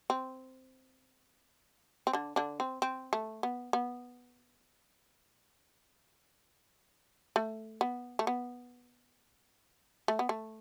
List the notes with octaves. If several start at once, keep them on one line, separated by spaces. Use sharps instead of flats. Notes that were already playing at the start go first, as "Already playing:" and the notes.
C4
C4
D3 D4
D3 D4
C4
C4
A3
B3
B3
A3
B3
A3
B3
A3
B3
A3